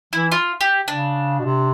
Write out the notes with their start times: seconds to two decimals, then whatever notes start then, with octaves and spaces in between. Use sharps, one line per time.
0.13 E3 E4
0.32 F4
0.61 G4
0.88 C#3 D4
1.39 B2
1.45 C3